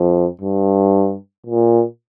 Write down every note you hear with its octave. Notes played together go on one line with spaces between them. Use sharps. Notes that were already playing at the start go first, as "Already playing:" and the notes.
Already playing: F2
G2
A#2